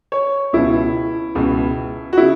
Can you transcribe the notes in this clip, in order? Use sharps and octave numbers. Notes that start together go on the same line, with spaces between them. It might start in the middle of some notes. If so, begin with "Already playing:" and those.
C#5
C#2 B2 E4
C#2 B2
F#4
C#3 E4